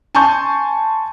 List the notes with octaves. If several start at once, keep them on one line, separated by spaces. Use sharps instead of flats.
G#5 A5 C6 C#6 G6